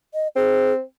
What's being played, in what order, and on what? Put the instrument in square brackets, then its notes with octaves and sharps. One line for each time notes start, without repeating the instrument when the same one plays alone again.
[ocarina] D#5
[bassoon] C4 [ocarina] G#4